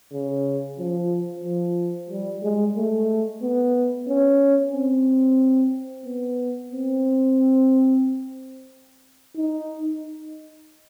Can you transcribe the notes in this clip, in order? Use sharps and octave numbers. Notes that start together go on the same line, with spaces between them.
C#3
F3
F3
G3
G#3
A3
B3
C#4
C4
B3
C4
D#4